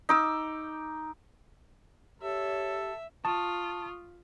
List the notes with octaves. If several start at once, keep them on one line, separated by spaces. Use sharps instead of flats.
D#4 D6 E6
G4 A4 C#5 E5
F4 A5 C#6 D#6